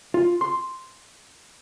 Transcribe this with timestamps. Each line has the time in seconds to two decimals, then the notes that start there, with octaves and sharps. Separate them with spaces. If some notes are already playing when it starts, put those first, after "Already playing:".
0.14 F4
0.41 C6